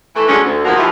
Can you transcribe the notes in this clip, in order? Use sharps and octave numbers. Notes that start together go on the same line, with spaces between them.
E3 A3
D3 F3 F#3 G#3 A3 C#4
D2
B2 D#3 F3 F#3 G#3 A#3
D#2 E3 F3